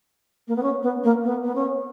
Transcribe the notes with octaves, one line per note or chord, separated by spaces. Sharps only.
A#3
B3
C#4
B3
A#3
B3
B3
C#4